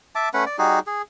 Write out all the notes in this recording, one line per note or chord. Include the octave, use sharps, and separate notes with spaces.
E5 A5 D6
A3 C#4 B4 F#5
D5
G3 D#4 F#4 G#4
G#4